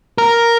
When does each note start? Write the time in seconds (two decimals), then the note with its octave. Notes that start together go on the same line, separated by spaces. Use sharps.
0.18 A#4